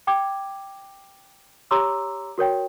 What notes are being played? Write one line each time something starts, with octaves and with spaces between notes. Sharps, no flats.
G5 D6 G#6
G4 C#5 A#5 C6 D6 E6
F#4 A#4 C#5 G5